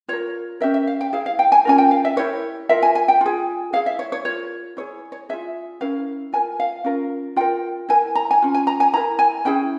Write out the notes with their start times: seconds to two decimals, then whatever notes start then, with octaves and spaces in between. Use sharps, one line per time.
0.08 F4 A#4 C#5
0.60 C#4 G4 A#4 E5
0.74 E5
0.87 F5
1.01 G5
1.13 E4 G#4 F5
1.26 F5
1.39 G5
1.52 G#5
1.65 C#4 F4 A#4 G#5
1.78 G5
1.91 F5
2.05 E5
2.16 E4 G4 A#4 C#5
2.69 F4 A#4 E5
2.82 G#5
2.95 G#5
3.08 G5
3.21 F4 G#4
3.73 E4 G#4 F5
3.86 E5
3.99 C#5
4.12 C#5
4.25 F4 A#4 C#5
4.77 E4 G#4 C#5
5.12 C#5
5.29 F4 G#4 E5
5.81 C#4 E4 A#4 F5
6.33 F4 A#4 G#5
6.60 F5
6.84 C#4 F4 A#4
7.36 F4 A#4 G5
7.89 E4 A#4 G#5
8.15 A#5
8.31 G#5
8.42 C#4 F4
8.54 G#5
8.67 A#5
8.80 G#5
8.93 E4 A#5
8.97 A#4
9.19 G#5
9.45 C#4 E4 G#4 G5